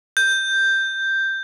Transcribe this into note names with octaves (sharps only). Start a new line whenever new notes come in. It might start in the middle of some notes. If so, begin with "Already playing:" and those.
G6